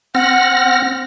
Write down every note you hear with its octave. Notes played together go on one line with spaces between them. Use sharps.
C4 F#5 F6 A#6